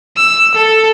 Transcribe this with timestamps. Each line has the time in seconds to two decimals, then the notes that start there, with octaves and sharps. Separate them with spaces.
0.17 E6
0.55 A4